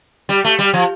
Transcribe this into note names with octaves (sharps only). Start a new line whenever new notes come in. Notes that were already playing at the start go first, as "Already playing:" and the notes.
G3
A3
G3
F3